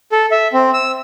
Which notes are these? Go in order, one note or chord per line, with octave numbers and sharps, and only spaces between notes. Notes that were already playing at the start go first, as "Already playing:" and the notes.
A4
E5
C4
E6